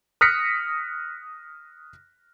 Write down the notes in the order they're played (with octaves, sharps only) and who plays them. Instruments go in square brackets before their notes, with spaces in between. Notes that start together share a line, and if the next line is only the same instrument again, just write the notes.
[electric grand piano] D#6 F6 F#6 A#6 B6 C#7